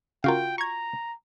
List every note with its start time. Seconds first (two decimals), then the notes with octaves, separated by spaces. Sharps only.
0.24 C#3 F4 F#4 A#4 F5 G5
0.58 A#5 C#6 G#6